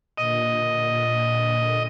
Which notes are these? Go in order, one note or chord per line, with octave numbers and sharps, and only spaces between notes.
A#2 D3 D#5